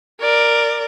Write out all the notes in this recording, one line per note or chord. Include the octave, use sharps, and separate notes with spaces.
A#4 D5